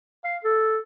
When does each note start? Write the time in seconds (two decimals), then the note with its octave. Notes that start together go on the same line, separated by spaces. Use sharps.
0.24 F5
0.44 A4